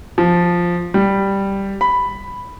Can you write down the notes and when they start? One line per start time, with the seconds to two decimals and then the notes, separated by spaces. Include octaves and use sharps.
0.18 F3
0.94 G3
1.81 B5